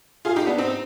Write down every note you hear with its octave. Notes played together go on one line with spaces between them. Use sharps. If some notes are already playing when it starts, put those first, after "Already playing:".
F4 G#4
D#4 G4
B3 D4
C4 D#4